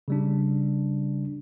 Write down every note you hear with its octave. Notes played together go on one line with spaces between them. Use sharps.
C#3 G3 D4